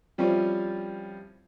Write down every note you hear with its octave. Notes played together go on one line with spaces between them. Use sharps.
F3 G3 C4 C#4 E4 F4